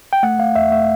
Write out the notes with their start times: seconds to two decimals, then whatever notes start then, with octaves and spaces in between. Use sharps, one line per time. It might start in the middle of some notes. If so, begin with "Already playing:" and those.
0.13 G5
0.23 A3 F#5
0.39 A3 F5
0.55 E2 E5
0.72 A3 E5